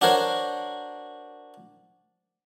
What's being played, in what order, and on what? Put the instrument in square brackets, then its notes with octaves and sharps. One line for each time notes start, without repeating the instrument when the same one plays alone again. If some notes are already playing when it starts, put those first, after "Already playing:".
[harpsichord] D4 F#4 A#4 C5 C#5